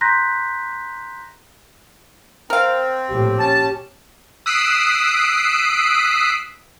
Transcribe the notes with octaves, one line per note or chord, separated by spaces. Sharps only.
A#5 C6 F#6 G6 A#6 B6
C4 A#4 F5
A#1 A2 G4
C#4 A5
D#6 E6 F#6 B6 C7 D7